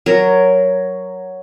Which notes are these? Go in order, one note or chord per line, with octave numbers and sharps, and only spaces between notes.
F#3 A#4